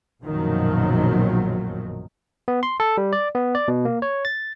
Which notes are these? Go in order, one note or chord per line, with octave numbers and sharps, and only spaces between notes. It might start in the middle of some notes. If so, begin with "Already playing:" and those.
A#1 F#2 B2 D#3 F3 F#3
B3
C6
A4
G3
D5
B3
D5
B2
A#3
C#5
A6